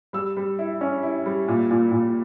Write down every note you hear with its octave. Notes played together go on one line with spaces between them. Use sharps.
G3 E6
G3
E4
C#4
E4
G3
A#2
A#2
A#2